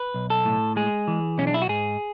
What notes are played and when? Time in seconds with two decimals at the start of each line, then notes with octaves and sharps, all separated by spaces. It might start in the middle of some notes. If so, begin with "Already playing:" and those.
Already playing: B4
0.14 B1
0.30 A4
0.45 A2
0.76 G#3 G#4
1.07 E3
1.38 B1 C#4
1.47 D4
1.54 E4
1.62 F#4
1.69 G#2 G#4